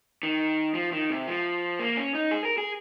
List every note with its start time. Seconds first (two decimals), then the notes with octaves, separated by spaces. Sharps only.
0.23 D#3
0.74 F3
0.92 D#3
1.10 C3
1.28 F3
1.79 A#3
1.97 C#4
2.15 D#4
2.31 G#4
2.45 A#4
2.58 G#4